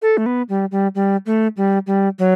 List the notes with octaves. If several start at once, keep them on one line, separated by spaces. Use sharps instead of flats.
A4
A3
B3
G3
G3
G3
A3
G3
G3
F#3